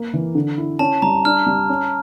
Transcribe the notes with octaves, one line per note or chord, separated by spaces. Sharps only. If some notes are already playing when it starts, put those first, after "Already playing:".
Already playing: A#3
E3
D3
E4
C#4 A5
G3 A#5
D4 F6
G3
C#4